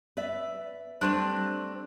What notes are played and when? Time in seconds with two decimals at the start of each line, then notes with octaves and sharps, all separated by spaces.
0.17 B4 D5 E5
1.01 G3 A3 C4 D4